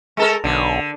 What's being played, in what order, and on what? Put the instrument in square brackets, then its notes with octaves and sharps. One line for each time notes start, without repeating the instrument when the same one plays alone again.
[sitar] G#3 A4 A#4
[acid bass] B1 [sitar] D3